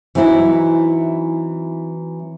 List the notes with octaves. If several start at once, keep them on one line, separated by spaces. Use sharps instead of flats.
E3 F#3 C4 D#4 E4